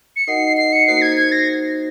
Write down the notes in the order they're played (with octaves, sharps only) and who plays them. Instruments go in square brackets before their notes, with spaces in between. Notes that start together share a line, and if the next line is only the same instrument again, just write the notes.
[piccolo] C#7
[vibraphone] D#4 F#4 A#4 D#5 F#5 [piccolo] C7
[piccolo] C7
C#7
[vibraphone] A#3 D#4 F#4 C5 [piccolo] C7
[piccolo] G#6
G#6
A#6